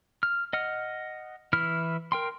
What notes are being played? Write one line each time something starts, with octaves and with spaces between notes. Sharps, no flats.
F6
D#5 F#5 F6
E3 E4 F6
A#4 G5 C6